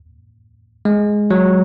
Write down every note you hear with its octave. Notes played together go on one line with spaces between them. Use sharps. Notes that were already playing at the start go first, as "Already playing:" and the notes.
G#3
F#3